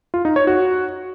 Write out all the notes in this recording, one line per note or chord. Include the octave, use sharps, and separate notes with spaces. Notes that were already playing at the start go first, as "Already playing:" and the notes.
F4
D#4
C#5
F#4